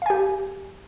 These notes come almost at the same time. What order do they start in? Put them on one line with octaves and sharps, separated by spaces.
F5 G#5 G4